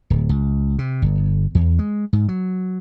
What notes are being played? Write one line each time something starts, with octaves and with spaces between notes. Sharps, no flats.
D1
C#2
C3
G1
E2
G#3
G#2
F#3